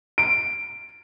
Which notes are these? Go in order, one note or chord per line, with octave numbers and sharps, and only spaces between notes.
D7